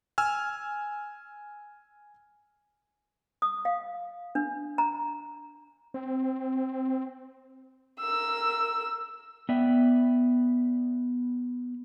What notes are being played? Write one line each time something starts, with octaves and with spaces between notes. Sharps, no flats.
G#5 E6 F6
D#6
F5
D4
A#5
C4
A#4 E6
B3 D5 E5 G5